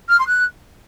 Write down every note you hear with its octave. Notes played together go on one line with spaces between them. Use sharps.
F6
C6
F#6